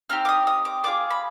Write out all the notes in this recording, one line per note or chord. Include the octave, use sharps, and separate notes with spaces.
C4 D#4 G4 F6
D6
D#6
D#6
D6
D4 F4 G#4 D6
B5